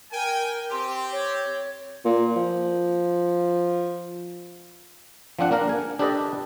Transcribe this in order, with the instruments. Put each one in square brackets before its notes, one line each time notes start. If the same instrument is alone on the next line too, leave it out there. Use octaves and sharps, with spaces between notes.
[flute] A#4 [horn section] G5 G#5
[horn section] C4 G4 [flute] C6
[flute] C#5
[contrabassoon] A#2
F3
[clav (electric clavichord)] F3 C4 D4 F#5
A#3 D4 A#4
G#5
D4 G4 A4 B4 D5 D#5